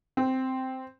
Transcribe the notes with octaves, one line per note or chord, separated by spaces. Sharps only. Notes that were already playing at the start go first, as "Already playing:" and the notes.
C4